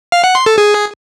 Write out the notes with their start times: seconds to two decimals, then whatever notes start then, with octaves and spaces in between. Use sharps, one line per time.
0.12 F5
0.24 F#5
0.35 C6
0.46 A4
0.58 G#4